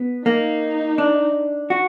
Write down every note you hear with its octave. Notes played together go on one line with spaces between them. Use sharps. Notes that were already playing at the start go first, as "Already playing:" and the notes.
Already playing: B3
A#3 D#4
D4
F#4